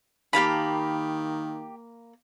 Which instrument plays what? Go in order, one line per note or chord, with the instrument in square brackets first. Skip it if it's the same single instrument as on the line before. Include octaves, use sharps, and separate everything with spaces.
[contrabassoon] D#3 [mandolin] A#3 B5 [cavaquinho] G4 F5 A5